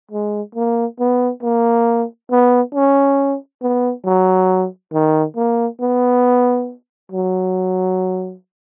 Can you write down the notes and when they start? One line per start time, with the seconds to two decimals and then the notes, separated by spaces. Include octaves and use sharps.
0.11 G#3
0.55 A#3
1.00 B3
1.42 A#3
2.31 B3
2.75 C#4
3.62 B3
4.05 F#3
4.93 D#3
5.36 A#3
5.81 B3
7.12 F#3